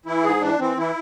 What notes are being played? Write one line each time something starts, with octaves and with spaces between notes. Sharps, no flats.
E3 E4
G#2 G#4
E3 D4
E3 C4
E3 E4